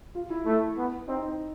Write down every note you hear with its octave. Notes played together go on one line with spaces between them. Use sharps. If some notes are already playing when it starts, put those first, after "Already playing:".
F4
E4
A3
B3
C4 D#4